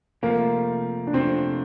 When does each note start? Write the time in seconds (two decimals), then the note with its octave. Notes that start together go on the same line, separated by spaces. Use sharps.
0.23 C3 F3 A3 A#3
1.07 D4
1.13 C3 F3 A3 C4